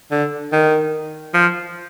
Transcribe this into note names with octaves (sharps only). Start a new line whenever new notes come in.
D3
D#3
F3